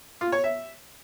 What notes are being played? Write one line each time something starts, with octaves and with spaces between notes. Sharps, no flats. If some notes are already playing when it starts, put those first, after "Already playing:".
F4
C#5
E5